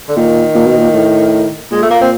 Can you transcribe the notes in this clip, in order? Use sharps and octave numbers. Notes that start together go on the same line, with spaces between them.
D3
A#2 D#3
A#2
B2
A#2
A2
A#2 G#3
A3
A#3
C4